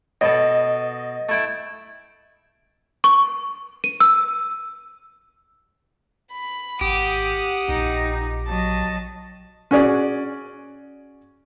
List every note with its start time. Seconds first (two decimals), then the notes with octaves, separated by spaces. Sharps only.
0.21 B2 B3 A4 D#5
1.29 A3 E4 G5
3.04 C#6
3.84 D#7
4.00 E6
6.32 B5
6.81 G#1 G4 F#5 D#6
7.69 A#1 A#2 D#4
8.47 F#3 D#5 A5
9.71 C#4 F#4 G#4 D5